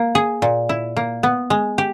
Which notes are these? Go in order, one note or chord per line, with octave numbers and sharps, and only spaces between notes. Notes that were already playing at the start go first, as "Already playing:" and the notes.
Already playing: A#3
G#4
A#2
E4
A#3
B3
G#3
G4